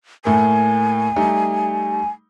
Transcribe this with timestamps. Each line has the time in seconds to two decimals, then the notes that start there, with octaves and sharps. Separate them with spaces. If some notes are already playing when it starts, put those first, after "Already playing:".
0.25 A2 A3 A#3 G#5
1.16 G3 A3 D#4